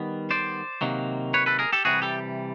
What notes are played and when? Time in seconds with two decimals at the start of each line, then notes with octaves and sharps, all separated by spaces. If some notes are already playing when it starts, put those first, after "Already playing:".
Already playing: D#3 G3 B3
0.31 C5 D5
0.81 C3 D#3 F#3 A#3
1.34 B4 C#5
1.46 A4 B4
1.59 G#4 A#4
1.73 G4 A4
1.85 C3 E3 G3 F#4 G#4
2.02 G4 A4